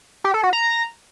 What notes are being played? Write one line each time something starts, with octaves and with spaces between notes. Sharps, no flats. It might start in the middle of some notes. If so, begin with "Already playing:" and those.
G4
A4
F#4
A#5